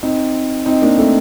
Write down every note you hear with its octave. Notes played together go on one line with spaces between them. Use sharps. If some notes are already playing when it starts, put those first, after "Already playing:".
C4 D#4
C4 D#4
A#3 D4
A3 C4